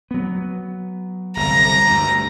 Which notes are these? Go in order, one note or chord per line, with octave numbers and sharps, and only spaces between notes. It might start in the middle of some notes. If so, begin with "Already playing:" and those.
F#3 B3
G1 C2 A#5
D2 G2